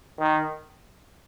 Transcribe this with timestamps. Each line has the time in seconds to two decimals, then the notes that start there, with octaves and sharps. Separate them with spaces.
0.19 D#3